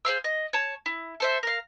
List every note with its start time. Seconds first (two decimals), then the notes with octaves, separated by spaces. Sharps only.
0.05 G#4 C5 F5 E6
0.24 D#5
0.53 C#5 A5
0.86 E4
1.20 A4 C5 E5
1.43 A#4 F5